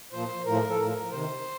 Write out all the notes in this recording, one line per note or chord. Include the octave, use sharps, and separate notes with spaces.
A#2 F3 C5
A2 F3 A#4
A4
A2 F3 A#4
C3 D#3 C5